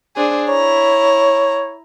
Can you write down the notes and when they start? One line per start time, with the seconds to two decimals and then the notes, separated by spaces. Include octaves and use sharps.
0.16 D4 G#4 C5
0.49 E4 C#5 A#5